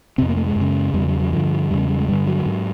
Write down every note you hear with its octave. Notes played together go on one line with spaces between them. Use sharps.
F2 C3 C4
A#3
A3
G#3
F#2
C#3
E2 C#3 G3
F#3
F#3
G2 D3 F3
E2 C#3 G3
G3
G#3
G2 D3 G3
F#3
G#2